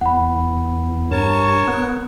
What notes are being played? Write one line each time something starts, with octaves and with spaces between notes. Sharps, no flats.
E2 F#5 B5
G2 A#4 C#5 A5 C#6
B3